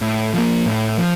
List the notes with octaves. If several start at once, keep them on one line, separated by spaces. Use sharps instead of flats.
A2
F3 A#3
A2
F3